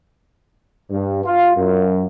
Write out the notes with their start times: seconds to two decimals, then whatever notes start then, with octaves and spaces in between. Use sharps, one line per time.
0.91 G2
1.25 F4
1.57 F#2